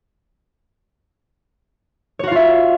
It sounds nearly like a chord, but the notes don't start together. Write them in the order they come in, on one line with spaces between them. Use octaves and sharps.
C#5 F#4 F5 F4 E5